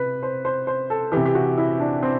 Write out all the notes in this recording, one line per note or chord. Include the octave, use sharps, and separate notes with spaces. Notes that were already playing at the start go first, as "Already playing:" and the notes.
Already playing: C3 B4
C5
C5
C5
A4
C3 E3 G4
G4
F#4
E4
D4
C4